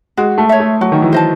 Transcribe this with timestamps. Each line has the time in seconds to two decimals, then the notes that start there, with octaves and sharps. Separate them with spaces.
0.17 G#3 F#4
0.38 A3
0.49 C#5 E5
0.60 A3
0.81 F#3 F#4
0.92 D#3
1.02 E3
1.13 C5 D#5 A5